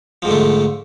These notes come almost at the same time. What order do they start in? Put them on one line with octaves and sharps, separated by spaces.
F3 G#2 D3 A3